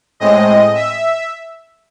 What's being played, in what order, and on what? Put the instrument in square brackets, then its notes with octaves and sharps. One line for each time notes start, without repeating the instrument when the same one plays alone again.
[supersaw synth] A2 G#3 C4 D#5
E5